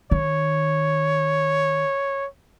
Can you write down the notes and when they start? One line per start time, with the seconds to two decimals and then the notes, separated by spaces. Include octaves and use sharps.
0.11 D#3 C#5